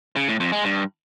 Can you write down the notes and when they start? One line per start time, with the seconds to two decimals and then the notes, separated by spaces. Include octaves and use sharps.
0.16 C#3
0.28 A2
0.40 F2
0.52 G#3
0.64 G2